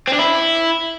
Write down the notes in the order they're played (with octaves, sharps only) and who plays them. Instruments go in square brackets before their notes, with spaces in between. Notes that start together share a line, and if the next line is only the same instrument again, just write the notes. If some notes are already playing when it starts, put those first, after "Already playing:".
[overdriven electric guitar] C4
D4
E4